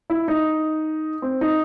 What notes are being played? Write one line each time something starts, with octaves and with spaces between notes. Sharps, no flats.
E4
D#4
C4
D#4